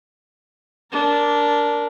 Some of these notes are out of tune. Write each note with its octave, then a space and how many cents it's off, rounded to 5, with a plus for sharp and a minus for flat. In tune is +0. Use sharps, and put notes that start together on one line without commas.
D4 -10 A#4 +0